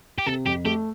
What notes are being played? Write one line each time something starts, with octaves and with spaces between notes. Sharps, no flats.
G4
C3 A4
F2 G4
A3 G4